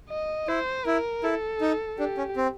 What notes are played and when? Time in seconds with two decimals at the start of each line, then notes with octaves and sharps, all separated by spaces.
0.10 D#5
0.48 E4 C5
0.86 E4 A#4
1.23 E4 A4
1.61 D#4
1.98 D4 G4
2.18 C#4
2.36 C4